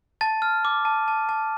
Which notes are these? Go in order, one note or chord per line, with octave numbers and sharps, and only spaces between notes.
A5 A6
F6
D6
A5
A5
A5